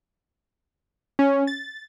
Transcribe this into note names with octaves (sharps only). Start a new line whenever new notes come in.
C#4
A6